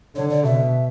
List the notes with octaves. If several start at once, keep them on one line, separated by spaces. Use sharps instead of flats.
D3 C#5
D5
B2 E5